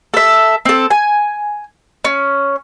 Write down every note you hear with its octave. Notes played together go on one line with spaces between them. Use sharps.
A4 E5
C4 A4
G#5
C#4